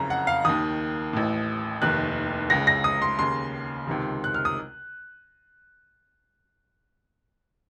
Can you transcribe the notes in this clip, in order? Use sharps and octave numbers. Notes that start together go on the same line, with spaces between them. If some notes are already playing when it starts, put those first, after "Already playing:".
Already playing: F#1 F2 C#3 A#5
F#5
F5
D#2 D#3 D#6
A1 A2
F1 D#2 D#3 F#6
C#2 C#3 A#6
A#6
D#6
C6
D#2 C#3 C6
C#2 C3 D#3
F#6
F6
D#6